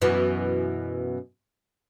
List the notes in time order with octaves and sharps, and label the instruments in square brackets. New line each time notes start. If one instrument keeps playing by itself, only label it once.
[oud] F#2 B2 E3